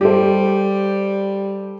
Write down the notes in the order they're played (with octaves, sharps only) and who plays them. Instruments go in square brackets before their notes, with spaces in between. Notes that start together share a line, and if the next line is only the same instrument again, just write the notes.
[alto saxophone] G3 [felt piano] G4 A4 C5